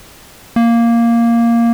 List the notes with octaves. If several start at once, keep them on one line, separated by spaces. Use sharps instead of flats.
A#3